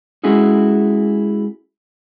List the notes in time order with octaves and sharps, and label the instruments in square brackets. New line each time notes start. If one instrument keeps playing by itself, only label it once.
[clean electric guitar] G#3 C#4 E4 F#4 G#4 A4